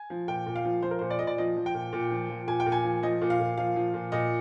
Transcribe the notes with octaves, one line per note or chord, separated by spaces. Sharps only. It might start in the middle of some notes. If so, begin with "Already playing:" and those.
Already playing: G#5
F3
A#2 G5
A#2
F5
F3
F3 C5
A#4
A#2 C5
D5
A#2 D#5
D5
F3 D#5
F3
G5
A#2
A#2
F3
F3
A#2 G#5
G5
A#2
G#5
F3
F3 D#5
A#2
F5
A#2
F3 F5
F3
A#2
A#2 D#5